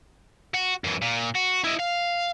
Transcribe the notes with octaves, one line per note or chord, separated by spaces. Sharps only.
F#4
F#2 E3
A#2
F#4
E4 D#5
F5